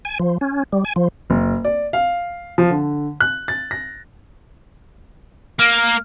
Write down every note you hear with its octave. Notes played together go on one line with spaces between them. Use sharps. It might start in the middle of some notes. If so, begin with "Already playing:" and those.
G#5
F3
C#4
G3
G#5
F3
F#1
D5
F5
F3
D3
F#6
A6
A#6
A#3 F6